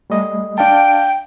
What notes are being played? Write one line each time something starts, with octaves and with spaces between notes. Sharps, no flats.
G3 A3 D#5
D4 F5 G5 A5